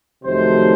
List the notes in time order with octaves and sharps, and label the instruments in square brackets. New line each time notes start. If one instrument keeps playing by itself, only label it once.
[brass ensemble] F2 C3 D#3 F#3 A3 C5